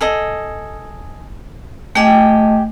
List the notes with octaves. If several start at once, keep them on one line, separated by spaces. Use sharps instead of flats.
G#4 A4 D#5
A3 G4 G#4 D#5 G5